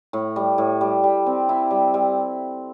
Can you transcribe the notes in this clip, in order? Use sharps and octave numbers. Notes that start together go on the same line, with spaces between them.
A2
G3
A2
G3
G3
C4
E4
G3
G3